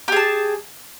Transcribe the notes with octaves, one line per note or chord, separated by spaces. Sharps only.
G4 G#4 A5